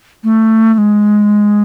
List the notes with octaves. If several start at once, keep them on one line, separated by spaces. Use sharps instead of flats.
A3
A3
G#3